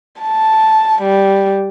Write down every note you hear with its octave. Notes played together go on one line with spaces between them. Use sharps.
A5
G3